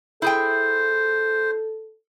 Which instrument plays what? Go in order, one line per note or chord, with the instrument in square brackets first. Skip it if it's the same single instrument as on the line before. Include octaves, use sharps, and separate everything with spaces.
[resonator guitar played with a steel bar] E4 G#4 G5 [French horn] A4 [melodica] C5